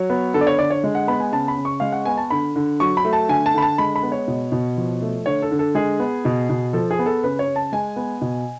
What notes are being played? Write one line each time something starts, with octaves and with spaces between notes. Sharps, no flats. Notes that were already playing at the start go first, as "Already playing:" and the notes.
Already playing: F#3 C#5
B3
D3 A4
D5
C#5
D3 D5
C#5
G#3
F#5
B3 B5
G#5
C#3 A5
B5
C#3
C#6
G#3 F5
F#5
B3 G#5
A5
D3 B5
D3
F#3 C#6
B5
A3
A5
D3 G#5
A5
D3 B5
A5
G#3 B5
B5
B3
C#5
B2
B2
F3
A3
D3 C#5
A4
D3
A4
G#3 G#4
B3
B2
B2
F3 A4
G#4
B3
A4
C#3 B4
C#5
C#3
A5
G#3 G#5
B3
B2